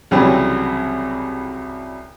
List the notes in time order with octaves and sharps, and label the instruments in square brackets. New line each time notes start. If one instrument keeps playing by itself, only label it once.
[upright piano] C2 C#3 E3 F#3 G3 C4